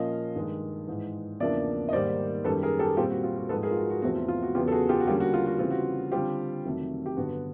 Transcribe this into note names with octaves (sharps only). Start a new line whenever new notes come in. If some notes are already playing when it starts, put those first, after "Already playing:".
Already playing: A#2 F3 A#3 C#4 D#5 F5
G2 D#3 G#3
G#2 E3 G#3
E2 C#3 F3 A#3 D4 D5 E5
D#5
G#2 D#3 G3 A#3 C5 D5
F#2 D#3 G3 A4 B4
G#4 A#4
G4 A4
A#2 G3 C4 F4 G4
F#4
F4
F#4
G#2 F3 G#3 A4 B4
G#4 A#4
F4
F#4
F#4
E2 C3 F3 A3 C4 F#4
F4
F4
F#4
E2 C#3 F#3 B3 F4 G4
A4
F#4 G#4
F4 G4
F#4
D3 G3 A#3 C#4 F4 G4
F#4
F4
F#4
C#3 E3 G3 C4 F4
F#4
D3 G3 C4 F4 G4
F2 C3 D#3 F#3 A3
G4
G2 D3 F#3 B3 F#4